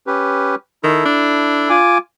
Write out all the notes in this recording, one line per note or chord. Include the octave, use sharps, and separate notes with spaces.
C#4 G4 B4
D#3 E4 A4
D4
F4 G#5 D6